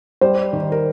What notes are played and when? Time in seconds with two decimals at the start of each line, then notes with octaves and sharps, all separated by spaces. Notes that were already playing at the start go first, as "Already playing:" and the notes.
0.21 G3 C5
0.53 D#3
0.72 A#4